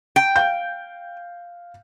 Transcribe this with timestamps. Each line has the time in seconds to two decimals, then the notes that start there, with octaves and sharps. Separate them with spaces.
0.16 G5
0.36 F5 G6